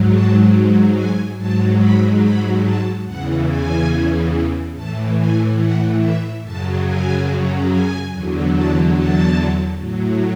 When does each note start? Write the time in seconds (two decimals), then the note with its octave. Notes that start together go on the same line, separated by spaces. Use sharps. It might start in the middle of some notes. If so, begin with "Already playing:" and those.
Already playing: G#2 F#3
0.11 A5
0.95 G#5
1.38 G#2 F#3 A5
1.80 B5
2.22 B5
2.63 A5
3.05 E2 C#3 E3 F#5
3.48 G#5
4.74 A2 E3 A5
5.17 G#5
5.59 F#5
6.00 E5
6.43 F#2 C#3 F#3 A5
6.85 G#5
7.69 G#5
8.11 E2 D3 F#3
8.54 A5
8.96 A5
9.80 A2 F#3